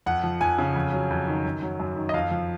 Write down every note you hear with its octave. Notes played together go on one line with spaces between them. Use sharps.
F2 F#5
F3
F2 G#5
C#3
F2
F#3
F2
D#3
F#2
F#3
F#2
D#3
D#5
F2 F5
F3